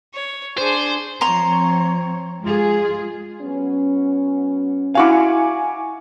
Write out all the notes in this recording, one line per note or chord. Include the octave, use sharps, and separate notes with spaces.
C#5
D4 G#4 C5
F3 C4 C#5 A#5 C6
G#3 F4 G#4
F#3 B3 C#4
E4 F#4 F5 G#5 C#6 D6